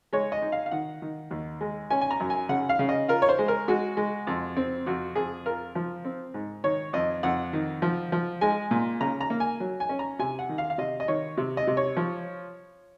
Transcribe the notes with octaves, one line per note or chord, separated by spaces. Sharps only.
G#3 C#5
D#5
D#4
F5
F5
D#3 F#5
D#3
D#2
G#3
C#4 G#5
G#5
A#5
F#2
G#5
C#3 F#5
F5
C#3
D#5
F4 A#4
C#5
C5
G#3
A#4
G#3 F#4
G#3
F2
C4
F2 F#4
F2 G#4
F4 A#4
F3
C4
G#2
D#3 C#5
F2 D#5
F2 F#5
D#3
F3
F3
G#3 G#5
A#2
C#3 A#5
A#5
A#3
G#5
F#3
G#5
C#4
A#5
C3 G#5
F#5
D#3
F5
F5
C3 D#5
D#5
D#3 C#5
C3
D#5
C3
C#5
F3